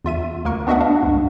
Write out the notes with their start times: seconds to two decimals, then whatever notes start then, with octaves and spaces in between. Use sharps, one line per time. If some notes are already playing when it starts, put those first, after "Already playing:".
0.05 E2 F4 E5 D#7
0.45 D2 A#3 A#4 C#6
0.67 B3 D4 F#4 D#5 E5 F#5
0.81 D4 F5
1.03 C#2 G2